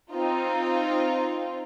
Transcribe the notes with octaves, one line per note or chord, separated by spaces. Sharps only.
C4 D#4 F4